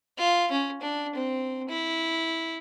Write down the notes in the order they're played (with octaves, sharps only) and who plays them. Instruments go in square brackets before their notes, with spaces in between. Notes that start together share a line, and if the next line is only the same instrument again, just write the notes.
[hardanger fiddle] F4
C#4
D4
C4
E4